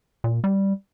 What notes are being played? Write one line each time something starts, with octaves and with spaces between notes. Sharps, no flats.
A#2
G3